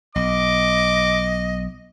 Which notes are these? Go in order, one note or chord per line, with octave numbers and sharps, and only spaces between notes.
B1 D#5 D6